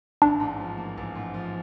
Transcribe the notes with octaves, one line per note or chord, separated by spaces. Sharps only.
A1 D4
G#2
F3
A#3
A1
G#2
F3